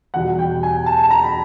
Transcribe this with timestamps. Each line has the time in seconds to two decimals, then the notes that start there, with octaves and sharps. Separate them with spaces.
0.14 E2 B2 G3 F#5
0.39 G5
0.63 G#5
0.86 A5
1.11 A#5
1.23 B5